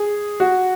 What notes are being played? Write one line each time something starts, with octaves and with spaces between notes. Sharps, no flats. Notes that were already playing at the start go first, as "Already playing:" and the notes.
Already playing: G#4
F#4